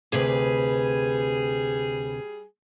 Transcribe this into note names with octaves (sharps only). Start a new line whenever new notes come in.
D2 C3 G3 G#4 B4